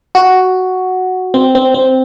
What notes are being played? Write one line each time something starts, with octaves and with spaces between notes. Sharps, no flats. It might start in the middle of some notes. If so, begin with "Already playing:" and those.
F#4
C4
C4
C4